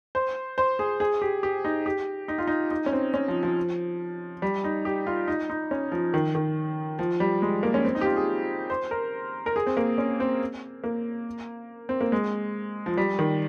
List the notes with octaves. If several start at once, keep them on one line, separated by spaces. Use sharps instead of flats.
C5
C5
G#4
G#4
G4
G4
D#4
G4
D#4
F4
D#4
D#4
C#4
C4
C#4
F3
F3
G3
D#4
G4
F4
D#4
D#4
C#4
F3
D#3
D#3
F3
G3
G#3
A#3
C#4
C4
D#4
G4
F4
G#4
C5
A#4
A#4
G#4
C4
A#3
C#4
C4
A#3
C4
A#3
G#3
F3
G3
D#3